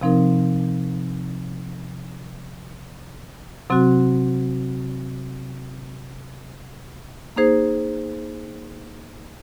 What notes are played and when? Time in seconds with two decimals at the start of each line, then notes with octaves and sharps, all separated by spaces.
0.01 C3 F3 C4 D#4 A#4
3.70 C3 F#3 C4 F#4
7.36 A#3 D#4 G#4 C5